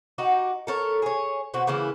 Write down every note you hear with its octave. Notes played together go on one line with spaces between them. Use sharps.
D#4 F#4 G4
A4 A#4 C#5
G#4 C#5
B2 C4 F#4
C#3 E3 A#3 E4